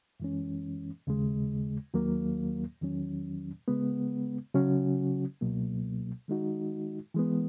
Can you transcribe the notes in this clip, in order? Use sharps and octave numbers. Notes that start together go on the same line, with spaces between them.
F#2 E3 G#3 C#4
D#2 C#3 G#3
D#2 D#3 F#3 A#3
E2 D#3 F#3 C#4
C#3 G#3 B3
C#3 F#3 C#4 F#4
C#2 B2 F#3 A#3
D#3 G#3 D#4 F#4
E3 G#3 B3